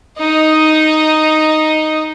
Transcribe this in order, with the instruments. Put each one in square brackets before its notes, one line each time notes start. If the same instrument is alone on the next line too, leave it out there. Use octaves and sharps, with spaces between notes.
[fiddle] D#4 D#5